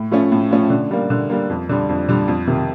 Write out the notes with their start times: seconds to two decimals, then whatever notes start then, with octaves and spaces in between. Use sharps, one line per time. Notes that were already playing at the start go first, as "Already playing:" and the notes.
Already playing: A2
0.11 F3 A3 C#4
0.32 A2
0.51 F3 A3 C#4
0.70 D3
0.91 G3 A#3
1.10 D3
1.30 G3 A#3
1.50 F2
1.69 D3 G3
1.89 F2
2.09 D3 G3
2.28 F2
2.47 C3 D#3